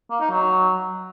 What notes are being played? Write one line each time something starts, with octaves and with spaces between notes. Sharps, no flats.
A#3
D#4
F#3